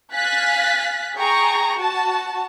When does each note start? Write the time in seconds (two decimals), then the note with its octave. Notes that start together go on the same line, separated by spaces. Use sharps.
0.13 F5 G#5 F#6 A6 B6
1.17 G#4 G5 A#5 C#6
1.78 F#4 A5